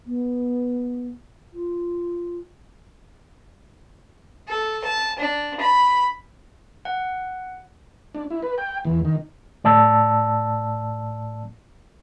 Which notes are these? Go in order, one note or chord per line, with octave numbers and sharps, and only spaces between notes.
B3
F4
A4
A5
D4
B5
F#5
D4
E4
B4
G5
E2
D#3
A2 D5 A5 E6